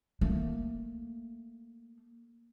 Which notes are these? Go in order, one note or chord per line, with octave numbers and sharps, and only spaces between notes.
A3 A#3